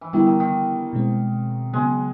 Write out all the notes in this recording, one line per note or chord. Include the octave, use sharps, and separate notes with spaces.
E3
D3 D#3 G3 B3 E4
D#3
D#3
B2 G#3 C4
C#3 F#3 G#3 B3